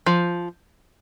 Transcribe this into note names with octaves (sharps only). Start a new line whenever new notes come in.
F3